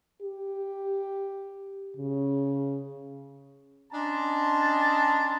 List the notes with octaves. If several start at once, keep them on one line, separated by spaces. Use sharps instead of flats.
G4
C#3
C#4 D4 D#5 A5 A#5 C6